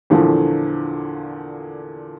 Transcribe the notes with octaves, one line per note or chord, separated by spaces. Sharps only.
E2 A#2 D3 E3 F3 A3